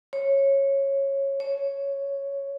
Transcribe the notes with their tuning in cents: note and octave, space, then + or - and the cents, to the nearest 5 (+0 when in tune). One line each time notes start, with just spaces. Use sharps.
C#5 -15
C#5 +0